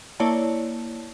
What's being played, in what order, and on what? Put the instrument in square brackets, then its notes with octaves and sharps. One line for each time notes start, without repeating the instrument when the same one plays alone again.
[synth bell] A#3 E4 C#5 D5 A5